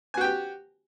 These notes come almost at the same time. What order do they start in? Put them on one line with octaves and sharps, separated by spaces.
G#5 F#4 G5 G4